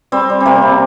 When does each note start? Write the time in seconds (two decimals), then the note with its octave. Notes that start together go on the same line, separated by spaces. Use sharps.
0.12 G3 C4
0.30 G3
0.40 C4
0.46 C3 A#3
0.62 C3